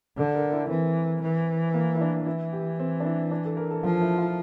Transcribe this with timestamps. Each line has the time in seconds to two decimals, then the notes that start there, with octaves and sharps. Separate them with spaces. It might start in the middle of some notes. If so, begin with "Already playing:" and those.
0.17 D3 A4
0.35 A#4
0.52 E4
0.69 E3 C4
1.22 E3
1.74 A#3
1.95 E4
2.01 D4
2.27 E3 E4
2.53 G4
2.79 C4
3.00 D4
3.05 E4
3.31 D4
3.45 A4
3.57 A#4
3.71 A4
3.83 F3 F4
4.01 E4
4.18 F4